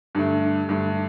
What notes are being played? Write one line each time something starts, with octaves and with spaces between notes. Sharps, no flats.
G2 D3 A3
G2 D3 A3